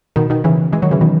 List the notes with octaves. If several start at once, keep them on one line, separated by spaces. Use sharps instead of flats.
B2 D#3
B2 D#3
C#3 E3
E3 G#3
D#3 F#3
C#3 E3
B2 D#3